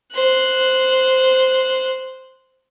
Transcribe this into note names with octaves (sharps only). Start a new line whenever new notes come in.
C5 F#6